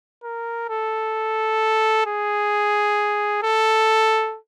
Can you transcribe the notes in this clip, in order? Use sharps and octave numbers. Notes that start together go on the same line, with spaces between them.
A#4
A4
G#4
A4